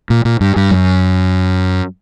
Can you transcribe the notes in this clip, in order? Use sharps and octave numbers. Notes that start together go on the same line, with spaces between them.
A#2
A#2
G2
G2
F#2